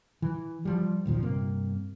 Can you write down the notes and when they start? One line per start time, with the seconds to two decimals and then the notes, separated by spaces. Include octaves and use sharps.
0.22 E3
0.65 F3 G3
1.06 G#1 D#2 A#2 F3
1.22 G2 C3 A#3